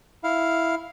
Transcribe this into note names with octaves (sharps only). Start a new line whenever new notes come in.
E4 F5